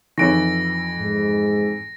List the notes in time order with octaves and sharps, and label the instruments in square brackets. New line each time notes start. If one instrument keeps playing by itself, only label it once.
[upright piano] F2 E3 F3 [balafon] D#4 C#5 [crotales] A#6 D7
[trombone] G#2